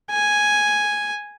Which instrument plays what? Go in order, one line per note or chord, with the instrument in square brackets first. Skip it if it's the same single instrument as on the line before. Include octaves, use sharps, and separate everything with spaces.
[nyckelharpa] G#5